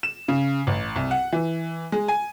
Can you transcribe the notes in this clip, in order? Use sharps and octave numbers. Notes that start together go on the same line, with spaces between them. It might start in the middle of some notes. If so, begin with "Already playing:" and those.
E7
C#3
A1
C2
F#5
E3
G#3
G#5